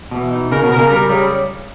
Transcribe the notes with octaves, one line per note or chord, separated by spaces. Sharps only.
B2 E3
D#4
C#3 A#4
B2
A#4
C#3
G3 A#4
C#3 G3